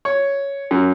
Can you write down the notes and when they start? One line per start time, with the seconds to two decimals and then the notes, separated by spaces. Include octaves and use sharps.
0.05 C#5
0.71 F#2